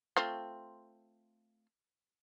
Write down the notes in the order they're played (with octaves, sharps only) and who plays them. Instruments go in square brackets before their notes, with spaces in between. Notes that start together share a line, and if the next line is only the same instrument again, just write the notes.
[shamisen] A3 C4 F4